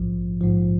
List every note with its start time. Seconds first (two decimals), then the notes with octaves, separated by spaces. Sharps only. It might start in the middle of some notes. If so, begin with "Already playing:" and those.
Already playing: A#1 G#2 F3
0.41 A#1 G#2 F3